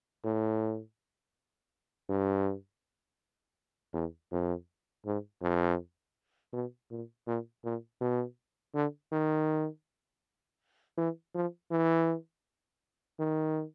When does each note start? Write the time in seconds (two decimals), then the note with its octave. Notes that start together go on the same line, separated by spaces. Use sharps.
0.25 A2
2.09 G2
3.94 E2
4.32 F2
5.06 G#2
5.42 F2
6.53 B2
6.91 A#2
7.27 A#2
7.65 A#2
8.01 B2
8.75 D3
9.12 D#3
10.98 E3
11.35 F3
11.71 E3
13.19 D#3